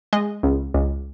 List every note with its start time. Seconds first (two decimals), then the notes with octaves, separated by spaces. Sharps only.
0.13 G#3 D#5
0.43 C#2
0.74 C#2